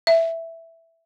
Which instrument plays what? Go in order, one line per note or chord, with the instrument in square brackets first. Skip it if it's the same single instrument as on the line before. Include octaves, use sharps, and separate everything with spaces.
[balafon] E5